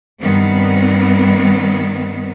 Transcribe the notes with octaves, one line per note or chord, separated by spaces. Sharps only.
G2 D#3 G3 B3 C4